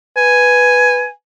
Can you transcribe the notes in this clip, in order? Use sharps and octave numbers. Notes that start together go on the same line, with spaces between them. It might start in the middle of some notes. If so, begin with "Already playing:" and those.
B4 G#5